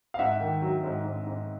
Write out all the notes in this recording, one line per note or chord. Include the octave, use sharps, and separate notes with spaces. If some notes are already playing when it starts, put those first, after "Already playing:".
F5
G#2 E5 F#5
D#3
F#3
G#2
G#2
G#2